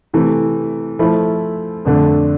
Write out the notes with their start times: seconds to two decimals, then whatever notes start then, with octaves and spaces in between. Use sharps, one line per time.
0.13 C3 E3 A3
0.99 F3 A3 E4
1.85 F2 D3 A3 D4